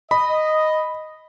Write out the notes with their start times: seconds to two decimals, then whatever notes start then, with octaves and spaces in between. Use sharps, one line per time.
0.11 D#5 B5